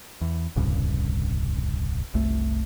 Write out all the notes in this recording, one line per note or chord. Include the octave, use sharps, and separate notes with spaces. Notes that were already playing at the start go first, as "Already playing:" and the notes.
E2
D#1 C2 G2 C#3
F#1 C2 A3